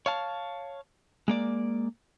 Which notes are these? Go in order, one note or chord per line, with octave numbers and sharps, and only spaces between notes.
C#5 F5 A5
G#3 A#3 D5